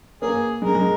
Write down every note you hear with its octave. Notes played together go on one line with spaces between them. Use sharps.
A#3 G#4
G#3 A#4
G#3